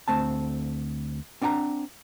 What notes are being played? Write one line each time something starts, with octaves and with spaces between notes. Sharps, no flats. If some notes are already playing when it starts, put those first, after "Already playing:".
D2 A3 C4 A5
C4 D4 F#5 G#5 A#5